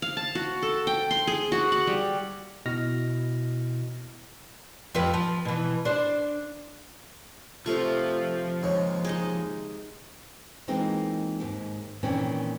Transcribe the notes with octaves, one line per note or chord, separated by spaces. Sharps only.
F5
A5
F#4
A4
G5
C6
G#4
F#4
F#5
G3
B2 E4 D#5 F6 A#6
F2 F3 B4
F3
B2 E3
D4 C5
C3 F3 A3 F4 C#6
D#2 G#2 C#5
G#3 D#4 D#5
E3 G#3 A#3 C4 D#4 F4
D#2 G#2
A#2 D#3 E3 C4 C#4